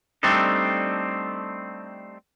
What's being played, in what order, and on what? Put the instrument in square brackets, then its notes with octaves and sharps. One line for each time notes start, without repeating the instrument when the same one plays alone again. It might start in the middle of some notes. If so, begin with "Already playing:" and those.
[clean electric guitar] G3 A3 C4 D4 D#4 A4